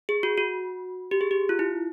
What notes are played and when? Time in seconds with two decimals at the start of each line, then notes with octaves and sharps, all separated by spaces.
0.09 G#4
0.23 F#4
0.38 F#4
1.11 G4
1.21 G#4
1.31 G4
1.49 F4
1.59 E4